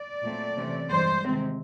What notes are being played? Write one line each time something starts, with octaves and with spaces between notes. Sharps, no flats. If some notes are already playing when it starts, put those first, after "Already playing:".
Already playing: D5
A#2 F#3 A3 C4
C3 E3 A3 C#4
G2 E3 G#3 C5
C3 D#3 G#3 C4